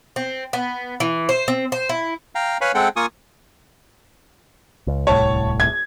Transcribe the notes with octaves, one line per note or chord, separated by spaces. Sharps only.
C4
B3
E3
C5
C4
C5
E4
F5 G5 A#5
B4 C#5 F5 G#5 B5
G#3 C4 A4 F#5 G5
A#3 F4 G#5 C#6 D#6
C#2
D1 C2 A2 C#5 A5
G#6